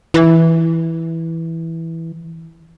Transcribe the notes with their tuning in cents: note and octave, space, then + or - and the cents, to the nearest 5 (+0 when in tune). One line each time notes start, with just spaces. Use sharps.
E3 -5